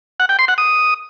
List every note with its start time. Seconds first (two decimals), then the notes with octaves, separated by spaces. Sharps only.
0.20 F#5
0.29 G5
0.39 C6
0.48 F#5
0.58 D#6